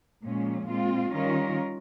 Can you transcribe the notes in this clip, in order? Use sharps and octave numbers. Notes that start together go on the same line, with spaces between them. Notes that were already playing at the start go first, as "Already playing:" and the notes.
A#2 F3 G#3 C#4
A#2 G#3 C4 F4
D#3 G3 C#4 F4 A#4